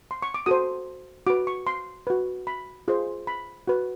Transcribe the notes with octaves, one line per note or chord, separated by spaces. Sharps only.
C6
C#6
D6
F#4 A4 C5 D#6
F#4 B4 D6
C#6
C6
F#4 B4
B5
F4 G#4 C5
B5
F#4 B4